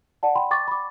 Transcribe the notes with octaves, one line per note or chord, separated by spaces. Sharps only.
D5 F#5 A5
G5 B5 C6
G5 C#6 D6 A6
B5 D6